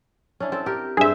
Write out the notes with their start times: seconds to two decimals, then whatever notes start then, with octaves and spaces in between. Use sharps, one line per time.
0.40 C#4 D4 E4
0.52 C4 A4
0.66 G4 A#4
0.97 G2 G#4 C5 E5